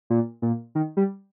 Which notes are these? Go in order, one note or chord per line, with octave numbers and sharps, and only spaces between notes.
A#2
A#2
D#3
G3